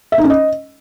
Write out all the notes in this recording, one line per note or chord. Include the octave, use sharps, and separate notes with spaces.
E5
D#4
C#4
D#5